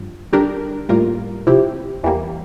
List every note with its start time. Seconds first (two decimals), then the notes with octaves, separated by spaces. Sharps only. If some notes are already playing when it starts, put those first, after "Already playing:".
Already playing: G2 F3
0.33 D3 G3 D4 G4 A#4
0.89 A2 G3 A#3 F4 A#4
1.47 C3 F3 C4 E4 G4
2.03 E2 E3 G3 A#3